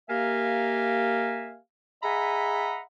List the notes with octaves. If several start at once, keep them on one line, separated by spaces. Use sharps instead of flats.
A#3 G4 A#4 E5 F5 G#5
G#4 D#5 E5 F#5 A#5 B5